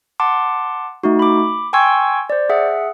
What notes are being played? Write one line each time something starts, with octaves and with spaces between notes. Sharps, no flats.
F#5 A5 C6 D6
A3 D#4 F#4
B5 D6
G5 G#5 C6 C#6 E6 G#6
C5 D5
G#4 E5 F#5